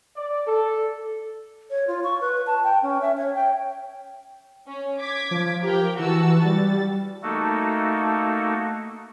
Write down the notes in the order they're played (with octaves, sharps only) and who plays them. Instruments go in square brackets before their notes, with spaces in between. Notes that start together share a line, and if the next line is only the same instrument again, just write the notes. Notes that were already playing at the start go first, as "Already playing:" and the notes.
[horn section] D5
A4
[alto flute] C#5
F4
C#6
B4
A5
G5
C#4
E5
C#5
G5
[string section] C#4
D6 G#6 B6
[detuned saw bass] F3
[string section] G4 A#4 G5
[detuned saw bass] E3 [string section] F#4 A5 E6
[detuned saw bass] G3 [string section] A6
[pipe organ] A3 A#3 D#4 F#4 A4